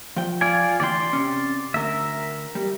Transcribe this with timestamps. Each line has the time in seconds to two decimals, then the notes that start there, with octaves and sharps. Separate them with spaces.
0.16 F3 G5
0.41 F4 D5 G#5
0.80 D2 E3 D5 G5 C6
1.13 C3 C#4
1.74 D2 A#4 E5
2.55 G3